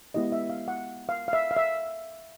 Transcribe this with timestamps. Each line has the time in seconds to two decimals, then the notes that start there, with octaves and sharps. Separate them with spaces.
0.14 G#3 B3 E4 G4 D#5
0.32 E5
0.50 F5
0.68 F#5
1.09 F5
1.28 F5
1.33 E5
1.51 F5
1.57 E5